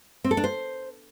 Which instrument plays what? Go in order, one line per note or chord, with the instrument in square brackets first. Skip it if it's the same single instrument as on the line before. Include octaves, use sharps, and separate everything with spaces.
[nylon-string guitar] C4
A4
D4
C5